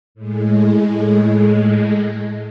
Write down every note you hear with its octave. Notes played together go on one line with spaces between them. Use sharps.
A2 G#3